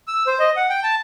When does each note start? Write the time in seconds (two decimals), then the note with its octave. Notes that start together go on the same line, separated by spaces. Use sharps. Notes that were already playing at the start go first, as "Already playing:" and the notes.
0.08 E6
0.27 C5
0.40 D#5
0.57 F#5
0.70 G5
0.83 A5